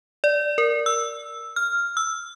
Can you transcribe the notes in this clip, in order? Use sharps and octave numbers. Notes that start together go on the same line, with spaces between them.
D5
A#4
E6
F6
E6